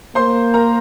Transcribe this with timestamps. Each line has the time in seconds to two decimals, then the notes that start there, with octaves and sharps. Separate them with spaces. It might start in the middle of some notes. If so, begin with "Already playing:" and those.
0.15 A#3 C5 C6
0.54 A#4 A#5